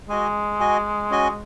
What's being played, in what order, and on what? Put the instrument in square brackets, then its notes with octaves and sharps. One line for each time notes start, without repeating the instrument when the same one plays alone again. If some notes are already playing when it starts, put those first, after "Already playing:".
[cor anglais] G#3 [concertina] F#4 D#5 G#5
[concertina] F#4 D#5 G#5
C#4 F#4 D#5 G#5